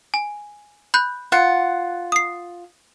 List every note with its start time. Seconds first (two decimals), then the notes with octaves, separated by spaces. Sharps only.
0.14 G#5
0.94 B5 F#6 G6
1.32 F4 F#5
2.12 D#6 C7